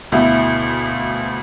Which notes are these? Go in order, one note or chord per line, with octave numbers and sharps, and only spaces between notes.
D2 B2 E4 F5